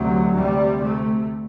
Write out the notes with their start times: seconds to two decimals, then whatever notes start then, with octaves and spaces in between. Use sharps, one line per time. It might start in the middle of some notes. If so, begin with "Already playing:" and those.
Already playing: D2 C3 F#3
0.34 D2 C3 G3
0.81 A3